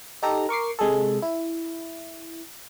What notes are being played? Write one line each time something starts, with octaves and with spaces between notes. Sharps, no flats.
D#4 G4 A4 A#5 A#6
A#4 C#6 D6 C7
C3 G#3 G#4 A4
E4